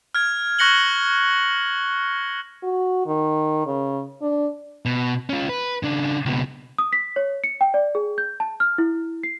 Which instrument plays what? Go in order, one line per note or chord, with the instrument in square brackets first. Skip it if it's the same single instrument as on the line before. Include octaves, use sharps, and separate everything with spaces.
[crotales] F6 G#6
C#6 F#6 A#6 C#7 F#7 G7
[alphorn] F#4
D#3
C#3
D4
[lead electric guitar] B2
C#4 F4
B4
C#3 D4
C#2 B2
[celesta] D#6
B6
C#5
C#7
G5
D5
G#4
G6
A5
F6
E4
C7